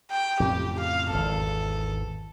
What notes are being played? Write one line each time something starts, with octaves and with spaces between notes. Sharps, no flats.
G5
F2 A2 C#3 G4
F5
G#1 E2 A4